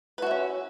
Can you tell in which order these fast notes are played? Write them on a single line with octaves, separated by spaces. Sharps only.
B4 F#4 E5 C#4